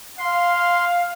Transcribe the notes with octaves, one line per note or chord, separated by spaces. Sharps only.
F5 C6